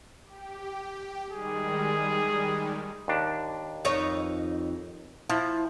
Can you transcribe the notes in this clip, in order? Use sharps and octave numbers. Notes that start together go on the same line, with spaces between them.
G4
D#3 G3 G#3 G#4
D#2 D4
F2 D#4 C#5
F3 E4